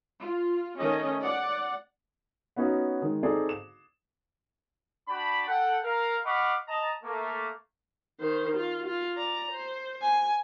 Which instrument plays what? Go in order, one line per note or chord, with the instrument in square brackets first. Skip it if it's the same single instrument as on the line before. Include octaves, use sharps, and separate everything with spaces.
[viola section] F4
D#3 A3 C#4 D#5
D5 F#5
[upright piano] B3 C#4 D#4 F#4
D#3 G#3
C4 D#4 G#4 A4 C5 D5
E7
[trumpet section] D4 F#4 G5 A5 B5
A4 F#5 G5
A#4 F5
D#5 F5 F#5 B5 C#6 D6
D#5 A5 A#5
A3 A#3
[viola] D#3 C5
F4
F4
D5 A#5
C5
G#5